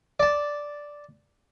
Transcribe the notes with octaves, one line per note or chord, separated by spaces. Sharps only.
D5 A5